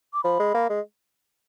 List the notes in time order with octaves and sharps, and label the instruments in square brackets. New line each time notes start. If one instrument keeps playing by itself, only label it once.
[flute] D6
[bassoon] F3 [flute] B5
[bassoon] G#3
A#3
G#3